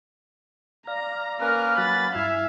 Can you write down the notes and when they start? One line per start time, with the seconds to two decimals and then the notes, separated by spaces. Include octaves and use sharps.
0.87 D5 F5 A#5 A#6
1.41 A#3 C#4 A#4 B4 F6
1.78 F#3 F#5 B5 A6
2.15 G2 E4 E5 F5 G#5